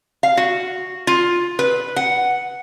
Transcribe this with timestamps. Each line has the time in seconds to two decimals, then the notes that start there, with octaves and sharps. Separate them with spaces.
0.23 F5
0.37 F#4
1.07 F4
1.59 B4
1.96 F#5